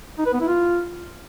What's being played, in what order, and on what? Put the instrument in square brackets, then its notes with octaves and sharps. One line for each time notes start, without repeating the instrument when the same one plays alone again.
[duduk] D#4
B4
B3
E4
F4